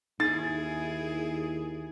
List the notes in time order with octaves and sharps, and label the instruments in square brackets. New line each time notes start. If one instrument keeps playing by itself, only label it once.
[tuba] D#2 [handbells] D#4 [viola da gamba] E4 G#4 [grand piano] A6